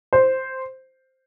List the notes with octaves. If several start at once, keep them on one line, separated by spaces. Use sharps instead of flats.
C5